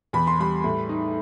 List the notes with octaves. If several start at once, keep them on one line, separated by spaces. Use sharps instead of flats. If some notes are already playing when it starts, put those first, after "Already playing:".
E2 B5
C6
G3 B5
A2
D#4